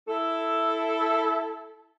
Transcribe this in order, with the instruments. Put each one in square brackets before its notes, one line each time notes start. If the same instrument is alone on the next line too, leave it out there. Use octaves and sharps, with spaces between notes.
[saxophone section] E4 A4